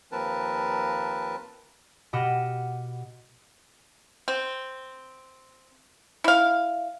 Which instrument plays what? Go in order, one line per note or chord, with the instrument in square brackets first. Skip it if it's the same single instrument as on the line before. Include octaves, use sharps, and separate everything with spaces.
[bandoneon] D#2 F3 C4 A#4 B4 A5
[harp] B2 G4 D#5 F#5 F6 E7
[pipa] C4
E4 F5